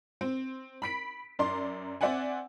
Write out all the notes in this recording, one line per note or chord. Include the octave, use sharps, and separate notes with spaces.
C4
B5 B6 D7
F#2 D5 A#5 C6
C4 D5 E5 F#5 G#5